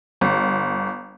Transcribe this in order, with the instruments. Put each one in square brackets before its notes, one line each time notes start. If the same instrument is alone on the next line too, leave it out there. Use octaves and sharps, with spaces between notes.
[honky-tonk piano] G1